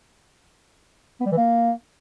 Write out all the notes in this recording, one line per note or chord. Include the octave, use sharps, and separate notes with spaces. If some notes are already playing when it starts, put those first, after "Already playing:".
B3
G3
E3
A#3